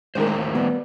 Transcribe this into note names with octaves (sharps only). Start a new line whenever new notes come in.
A2 D#3 G#3 D#4 A#4 C5
D#2
G3 B3